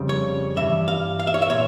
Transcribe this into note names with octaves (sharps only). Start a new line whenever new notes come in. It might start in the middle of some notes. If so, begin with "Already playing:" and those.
Already playing: F2 C#3 G3
C#5
G2 E3 G3 E5
F5
F5
E5
C#5
E5
A#2 C#5